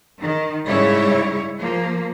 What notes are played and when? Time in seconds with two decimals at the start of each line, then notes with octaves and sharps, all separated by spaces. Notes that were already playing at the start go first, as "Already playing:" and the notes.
0.21 D#3
0.66 G#2 C#3 G3 E4 C#5
1.57 F3 A#3